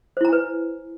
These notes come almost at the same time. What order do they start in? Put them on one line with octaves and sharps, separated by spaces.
C5 E4 A#5 G#5 B4